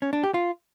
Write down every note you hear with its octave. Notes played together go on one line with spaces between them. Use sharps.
C#4
D4
G4
F4